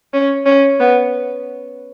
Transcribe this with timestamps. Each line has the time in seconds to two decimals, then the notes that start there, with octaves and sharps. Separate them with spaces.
0.14 C#4
0.46 C#4
0.80 B3